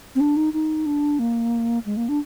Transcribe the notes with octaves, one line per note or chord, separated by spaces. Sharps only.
C4
D4
D#4
D#4
D4
A#3
G#3
A#3
D4